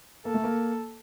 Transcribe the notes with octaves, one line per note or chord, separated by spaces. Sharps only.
A#3 A4
A3
A#3